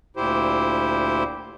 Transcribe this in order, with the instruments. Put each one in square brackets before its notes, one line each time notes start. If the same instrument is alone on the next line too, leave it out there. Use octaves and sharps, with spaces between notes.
[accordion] D2 A#2 E4 G4 C5